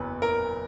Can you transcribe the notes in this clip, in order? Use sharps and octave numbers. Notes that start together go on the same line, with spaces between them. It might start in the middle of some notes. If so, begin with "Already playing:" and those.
Already playing: F#1 E2 B4
A#4